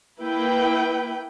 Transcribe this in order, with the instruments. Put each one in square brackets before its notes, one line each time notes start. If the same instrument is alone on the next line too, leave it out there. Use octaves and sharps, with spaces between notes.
[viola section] A#3 E4 B4 G5